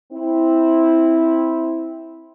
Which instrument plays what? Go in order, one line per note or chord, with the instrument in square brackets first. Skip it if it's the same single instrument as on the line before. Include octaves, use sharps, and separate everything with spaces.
[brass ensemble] C4 E4